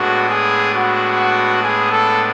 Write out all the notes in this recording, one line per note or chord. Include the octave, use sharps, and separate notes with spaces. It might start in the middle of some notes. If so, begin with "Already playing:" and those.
Already playing: A2 G#3 B3 D4 F#4
G#4
F#4
G#4
A4